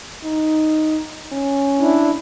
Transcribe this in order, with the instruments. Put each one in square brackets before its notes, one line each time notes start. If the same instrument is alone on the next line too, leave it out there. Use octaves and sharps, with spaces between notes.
[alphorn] D#4
C#4
[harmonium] D4 E4